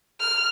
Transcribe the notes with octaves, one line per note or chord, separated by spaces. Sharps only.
F6